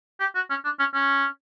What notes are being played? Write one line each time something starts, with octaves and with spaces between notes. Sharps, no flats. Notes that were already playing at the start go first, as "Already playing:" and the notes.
G4
F#4
C#4
D4
C#4
C#4